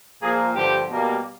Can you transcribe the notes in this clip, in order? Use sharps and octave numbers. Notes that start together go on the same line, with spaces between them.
A#2 F3 A#3 G#4
G2 D3 F3 G4
B2 G3 A#3